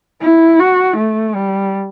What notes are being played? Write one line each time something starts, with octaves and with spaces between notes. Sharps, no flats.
E4
F#4
A3
G3